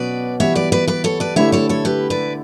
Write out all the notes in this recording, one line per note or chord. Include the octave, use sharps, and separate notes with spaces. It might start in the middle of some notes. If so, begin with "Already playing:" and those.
Already playing: B2 F#3 C#4 B4 D5
E3 G3 B3 C#5 E5
B4 D5
B4 D5
B4 D5
A4 C#5
B4 D5
D3 A3 E4 G4 C#5 E5
A4 C#5
A4 C#5
G4 B4
B4 D5